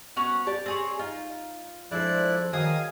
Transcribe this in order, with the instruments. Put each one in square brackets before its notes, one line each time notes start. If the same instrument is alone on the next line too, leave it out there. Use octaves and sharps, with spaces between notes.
[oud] B3 [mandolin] C#4 F#4 F#5
[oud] G4 D5 [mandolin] A5
[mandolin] C4 G#4 C#5 [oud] G4
[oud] D#4 [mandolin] F4
[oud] D3 G#3 C4 [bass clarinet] F3 [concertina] E4 D5 F#6
[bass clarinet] D#3 [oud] F#3 [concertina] G#4 F5 G#5 [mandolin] D#5 D#6